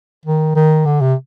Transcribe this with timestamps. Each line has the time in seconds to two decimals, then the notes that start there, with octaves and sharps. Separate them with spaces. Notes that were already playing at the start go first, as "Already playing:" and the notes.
0.25 D#3
0.55 D#3
0.85 D3
1.01 C3